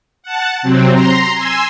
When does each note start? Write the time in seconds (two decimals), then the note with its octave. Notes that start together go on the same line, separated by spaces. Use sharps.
0.23 F#5 A5
0.62 C3 F#3 C4
0.92 A#5 C6
1.35 G#5 C6 E6